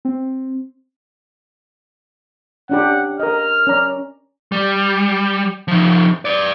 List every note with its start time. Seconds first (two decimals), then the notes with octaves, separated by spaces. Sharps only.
0.05 C4
2.70 C#4 D4 G4 F#5
3.20 A#4 D#5 F6
3.67 C#4 D5 A#5
4.52 G3
5.68 F3 D#4
6.25 B4 D5